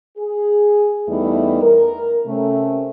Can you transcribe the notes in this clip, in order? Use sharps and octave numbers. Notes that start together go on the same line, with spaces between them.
G#4
E2 G3 A3 B3 D#4 E4
A#4
C3 A3 C#4